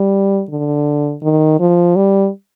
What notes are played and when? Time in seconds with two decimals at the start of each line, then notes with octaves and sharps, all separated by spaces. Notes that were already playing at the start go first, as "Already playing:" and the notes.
Already playing: G3
0.50 D3
1.22 D#3
1.60 F3
1.96 G3